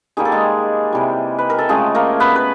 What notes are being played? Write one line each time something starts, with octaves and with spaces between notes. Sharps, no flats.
D#3 G3 A#3 G#4
A4
G#3 G#4
C3 E3 G3
B4
A#4
A4
C#3 F3 G#3 A3 G#4
A#3 A#4
B3 B4
B4